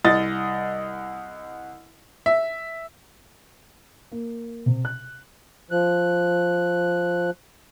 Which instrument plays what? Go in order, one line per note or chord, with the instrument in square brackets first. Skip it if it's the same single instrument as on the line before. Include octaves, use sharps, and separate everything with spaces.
[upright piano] C2 D#5 A6
E5
[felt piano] A#3
C3
F#6
[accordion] F3 F#6